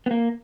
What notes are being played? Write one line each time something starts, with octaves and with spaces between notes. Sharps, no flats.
B3
A#3